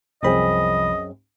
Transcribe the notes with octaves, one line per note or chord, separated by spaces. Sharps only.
C2 F#2 F3 C4 G#4 D#5 B5